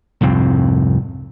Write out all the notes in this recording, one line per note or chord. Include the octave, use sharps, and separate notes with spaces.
C2 F2 G#2 C4